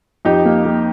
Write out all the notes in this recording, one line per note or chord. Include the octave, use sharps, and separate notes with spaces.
F2 D#4 G4
A#3
A#3